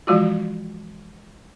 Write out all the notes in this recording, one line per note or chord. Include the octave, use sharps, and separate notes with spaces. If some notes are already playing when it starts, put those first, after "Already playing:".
E3 F3 G#3 F4 F#4